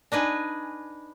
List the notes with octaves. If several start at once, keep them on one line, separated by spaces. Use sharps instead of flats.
D4 D#4 B4 G#5